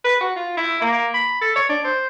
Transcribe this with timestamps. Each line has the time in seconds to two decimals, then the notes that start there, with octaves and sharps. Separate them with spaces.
0.04 B4
0.20 F#4
0.36 F4
0.57 E4
0.81 A#3
1.14 B5
1.41 A4
1.56 C#5
1.69 D4
1.84 C5